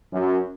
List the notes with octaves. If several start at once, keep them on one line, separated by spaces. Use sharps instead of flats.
F#2